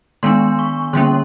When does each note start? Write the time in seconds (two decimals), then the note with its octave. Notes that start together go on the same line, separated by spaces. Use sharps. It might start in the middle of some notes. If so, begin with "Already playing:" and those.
0.23 D#3 G#3 B3 D4 C6
0.59 C#6
0.93 D3 G3 A#3 C#4 C6